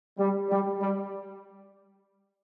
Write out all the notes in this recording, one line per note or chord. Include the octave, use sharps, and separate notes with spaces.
G3
G3
G3